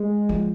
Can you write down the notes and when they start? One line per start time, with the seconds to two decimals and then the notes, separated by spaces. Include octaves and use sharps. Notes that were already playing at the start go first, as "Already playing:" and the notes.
Already playing: G#3
0.29 F3